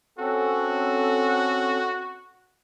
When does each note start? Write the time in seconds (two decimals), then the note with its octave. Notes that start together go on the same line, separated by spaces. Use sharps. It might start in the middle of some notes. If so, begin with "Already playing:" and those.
0.18 C4 C#4 F#4 A4